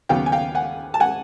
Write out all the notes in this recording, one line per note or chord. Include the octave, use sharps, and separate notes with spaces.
D#2 C#3 F#3 B3 F5 G5
G#5
F5 G5
F#5 G#5
A5
F#5 G#5